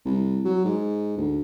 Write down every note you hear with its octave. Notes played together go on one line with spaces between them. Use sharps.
C2
F#3
G#2
D2